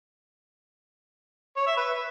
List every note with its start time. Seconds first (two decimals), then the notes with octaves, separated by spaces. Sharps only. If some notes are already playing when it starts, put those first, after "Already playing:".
1.57 C#5
1.67 E5
1.77 B4